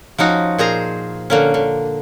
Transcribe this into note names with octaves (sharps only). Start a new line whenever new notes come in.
F3 C#4 D#4 F#4
A#2 G#4 C5 A#5
D3 A#3 C#4
D3